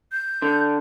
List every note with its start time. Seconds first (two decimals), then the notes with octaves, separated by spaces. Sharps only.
0.12 G6
0.42 D3